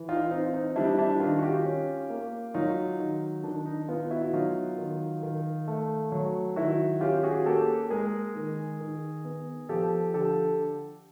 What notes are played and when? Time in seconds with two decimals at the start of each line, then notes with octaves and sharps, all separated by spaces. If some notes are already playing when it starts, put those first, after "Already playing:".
Already playing: E3
0.09 D#4 F4
0.31 C4 D#4
0.54 D#4
0.76 G3 D4 E4
0.98 D4 E4
1.20 D#3 D#4 F4
1.39 F#4
1.42 F4 G4
1.65 C#4
2.10 A#3
2.54 F#3 D#4 F4
2.99 D#3 D#4
3.43 D#3 D4
3.66 D#4
3.88 B3 D#4 F4
4.10 E4 F#4
4.33 F#3 D#4 F4
4.78 D#3
5.23 D#3
5.68 A3
6.12 F#3
6.56 D#3 E4 F#4
7.01 C#4 F4 G4
7.23 F#4 G#4
7.46 A#3 G4 A4
7.90 G#3 G#4 A#4
8.35 D#3
8.80 D#3
9.25 B3
9.69 F3 G4 A4
10.14 D3 G4 A4